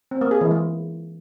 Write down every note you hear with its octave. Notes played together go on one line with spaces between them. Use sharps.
C4
A#3
G#4
E3
G#3